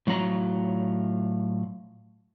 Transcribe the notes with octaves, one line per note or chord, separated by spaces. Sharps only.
A2 F#3 F4 F#4 A#5